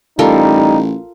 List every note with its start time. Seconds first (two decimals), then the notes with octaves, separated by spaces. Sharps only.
0.19 A1 G3 D#4 F4 A4 A#4